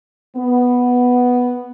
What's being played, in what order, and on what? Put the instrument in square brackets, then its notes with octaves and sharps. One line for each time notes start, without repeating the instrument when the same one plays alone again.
[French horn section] B3